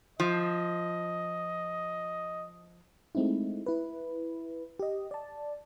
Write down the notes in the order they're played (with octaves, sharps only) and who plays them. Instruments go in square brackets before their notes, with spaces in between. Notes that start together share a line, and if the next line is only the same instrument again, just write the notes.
[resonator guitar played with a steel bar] F3 [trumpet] D#5
[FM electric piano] G#3 A3 C4 D#4 E4
E4 B4
G4 D#5
D5 A5